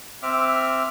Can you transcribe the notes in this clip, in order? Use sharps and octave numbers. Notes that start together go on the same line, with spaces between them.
C4 E5 D6 F6